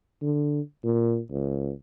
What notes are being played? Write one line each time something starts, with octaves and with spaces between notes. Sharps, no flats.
D3
A#2
C#2